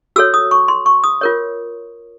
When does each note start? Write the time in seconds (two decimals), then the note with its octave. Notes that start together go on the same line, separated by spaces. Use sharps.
0.16 F#4 A4 C#5 E6
0.34 D#6
0.51 C#6
0.68 C6
0.86 C#6
1.04 D#6
1.21 F4 A#4 C#5